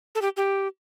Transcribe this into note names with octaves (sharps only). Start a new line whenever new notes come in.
A4
G4
G4